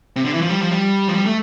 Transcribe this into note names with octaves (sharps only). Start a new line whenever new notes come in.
C3
D3
E3
F3
G3
F3
G3
F3
G3
A3